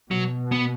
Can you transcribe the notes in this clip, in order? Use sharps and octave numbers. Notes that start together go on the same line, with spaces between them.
B2 F#3
B3